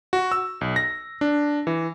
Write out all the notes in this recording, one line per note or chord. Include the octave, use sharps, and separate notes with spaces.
F#4
E6
B1
A#6
D4
E3